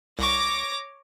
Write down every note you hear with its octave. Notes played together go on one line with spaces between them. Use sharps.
C2 C#5 C#6 D6 A#6